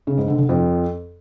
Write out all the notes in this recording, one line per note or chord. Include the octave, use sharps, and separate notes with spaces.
C#3
G#2
D3
D3
F2